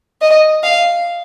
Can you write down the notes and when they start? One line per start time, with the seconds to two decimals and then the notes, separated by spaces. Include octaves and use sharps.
0.21 D#5
0.63 F5